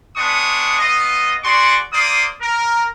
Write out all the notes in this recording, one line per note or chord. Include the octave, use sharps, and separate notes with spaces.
G#3 B3 D4 C#6 D#6
B3 F4 D#5
F#4 G#4 D5 C6 C#6
A#3 C5 D5 D#6
A#4